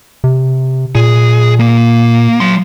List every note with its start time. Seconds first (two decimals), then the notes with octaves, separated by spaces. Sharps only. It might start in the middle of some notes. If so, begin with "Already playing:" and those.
0.24 C3
0.95 A#2 G#4
1.59 A#3
2.40 F#3 C6